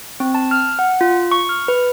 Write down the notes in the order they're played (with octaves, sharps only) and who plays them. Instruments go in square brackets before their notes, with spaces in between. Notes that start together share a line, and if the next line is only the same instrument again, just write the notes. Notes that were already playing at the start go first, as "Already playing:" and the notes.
[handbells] C4
A5
F6
F#5
F4
C#6
F6
B4